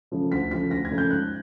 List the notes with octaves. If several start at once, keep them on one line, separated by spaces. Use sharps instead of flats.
C#3 F3 A3
D2 B6
C#3 F3 A3 B6
D2 A#6
G#6
C#3 F3 A3
G6
G#2 F#6